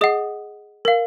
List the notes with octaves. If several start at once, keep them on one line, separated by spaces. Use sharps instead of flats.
G#4 D#5 F#5 D#6
A#4 F5